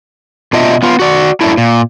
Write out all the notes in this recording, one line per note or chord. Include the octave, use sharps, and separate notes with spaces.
B2 D4 F4 D#5 E5
B3 F4
F#4 D5
F#2 A3 D4 E4
A#2